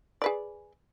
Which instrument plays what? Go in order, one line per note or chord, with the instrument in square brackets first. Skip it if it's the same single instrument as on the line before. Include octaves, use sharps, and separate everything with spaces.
[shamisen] G#4 B4 D5